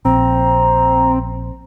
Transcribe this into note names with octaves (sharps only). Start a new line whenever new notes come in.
A#1 C4 A#5